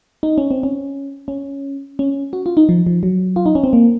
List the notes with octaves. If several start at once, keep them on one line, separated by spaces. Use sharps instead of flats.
D#4
C#4
C4
C#4
C#4
C#4
F#4
F4
D#4
F3
F3
F#3
F4
D#4
C#4
C4
A#3